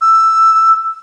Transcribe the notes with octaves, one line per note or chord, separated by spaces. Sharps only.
E6